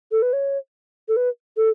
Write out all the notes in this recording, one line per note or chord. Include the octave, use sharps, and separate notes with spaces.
A4
B4
C#5
A4
B4
A4